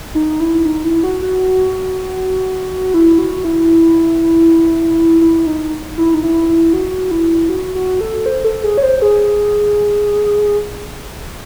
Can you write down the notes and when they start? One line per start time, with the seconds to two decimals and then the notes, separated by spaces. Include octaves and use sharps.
0.15 D#4
0.40 E4
0.65 D#4
0.84 E4
1.04 F#4
1.22 F#4
2.94 E4
3.19 F#4
3.45 E4
5.21 E4
5.47 D#4
5.98 E4
6.14 D#4
6.23 E4
6.49 E4
6.73 F#4
7.11 E4
7.49 F#4
7.75 F#4
8.01 A4
8.26 C5
8.44 A4
8.64 G#4
8.77 C#5
8.83 C5
9.02 G#4